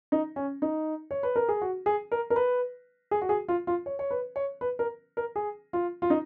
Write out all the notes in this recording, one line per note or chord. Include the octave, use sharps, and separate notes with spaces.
D#4
C#4
D#4
C#5
B4
A#4
G#4
F#4
G#4
A#4
A#4
B4
G#4
F#4
G#4
F4
F4
C#5
C#5
B4
C#5
B4
A#4
A#4
G#4
F4
F4
D#4